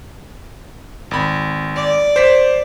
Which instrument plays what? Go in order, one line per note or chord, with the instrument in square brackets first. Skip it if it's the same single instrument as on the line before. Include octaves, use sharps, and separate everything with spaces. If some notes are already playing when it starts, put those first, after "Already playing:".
[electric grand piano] G#1 B5
[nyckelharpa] D5
[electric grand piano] C5 B6